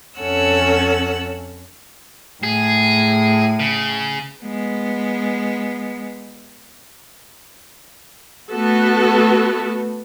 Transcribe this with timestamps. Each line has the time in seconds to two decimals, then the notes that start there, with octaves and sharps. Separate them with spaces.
0.19 F2 C#4 A4 F#5 E6
2.43 A2 G#4
3.59 C#3
4.42 G#3 B3
8.51 A3 B3 F#4 A4